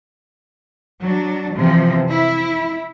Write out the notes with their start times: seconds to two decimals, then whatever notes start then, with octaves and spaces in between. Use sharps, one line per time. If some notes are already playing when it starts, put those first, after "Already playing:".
1.03 F#3 D4
1.58 C3 E3 F3
2.09 E4